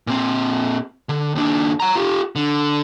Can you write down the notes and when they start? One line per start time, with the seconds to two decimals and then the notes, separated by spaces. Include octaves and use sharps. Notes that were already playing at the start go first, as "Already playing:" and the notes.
0.07 A#2 C4
1.09 D3
1.35 D#2 D4
1.80 F#5 A#5
1.95 F4 G4
2.36 D3